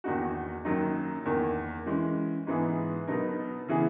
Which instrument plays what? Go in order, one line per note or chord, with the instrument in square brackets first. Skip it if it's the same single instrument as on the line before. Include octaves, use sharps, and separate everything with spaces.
[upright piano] E2 D#3 A#3 D#4 F#4
F#2 D#3 F#3 A#3 D#4
E2 D#3 A#3
E3 G#3 C#4
G#2 E3 B3 E4 G#4
B2 F#3 B3 D#4 A#4
C#3 E3 B3 E4 G#4